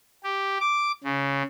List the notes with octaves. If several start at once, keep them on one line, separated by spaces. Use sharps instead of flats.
G4
D6
C#3